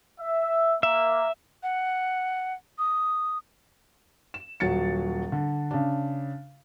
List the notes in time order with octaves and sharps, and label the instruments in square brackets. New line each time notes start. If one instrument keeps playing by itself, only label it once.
[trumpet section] E5
[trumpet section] A#3 [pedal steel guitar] E5
[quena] F#5
D#6
[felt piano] E7
D#1 F#3 A6 C#7
D3
C#3 D4